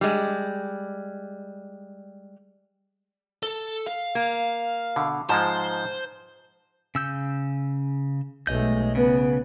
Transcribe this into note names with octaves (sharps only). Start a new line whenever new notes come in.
G3 G#3
A4
F5
A#3
B2 D3
G#2 F3 G#3 C5 A5
C#3 E6 G6
B1 G#3 A3 D#5 G6
C#3 B3